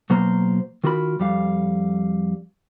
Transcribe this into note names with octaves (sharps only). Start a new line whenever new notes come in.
B2 F#3 A#3 C5 A#5
D#3 F4 F#4 A#4 B5
F2 G3 F5